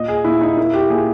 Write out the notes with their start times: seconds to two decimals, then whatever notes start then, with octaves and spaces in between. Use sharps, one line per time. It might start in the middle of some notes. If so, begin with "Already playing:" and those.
Already playing: A#2 D#5
0.08 G#4
0.24 A#2 E4
0.41 D#4
0.57 A#3 E4
0.73 G4
0.90 A#2 G#4